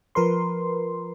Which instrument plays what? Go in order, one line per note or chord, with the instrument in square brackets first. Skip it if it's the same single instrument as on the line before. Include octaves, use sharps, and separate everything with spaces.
[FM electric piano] F3 A#4 B4 C6